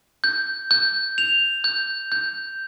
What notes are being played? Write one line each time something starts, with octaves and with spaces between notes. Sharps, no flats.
G6
G6
F7
G6
G6